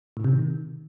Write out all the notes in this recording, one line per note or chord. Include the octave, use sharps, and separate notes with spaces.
A2
C3
D#3